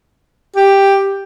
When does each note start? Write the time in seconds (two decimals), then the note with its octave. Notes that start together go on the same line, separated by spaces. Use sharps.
0.56 G4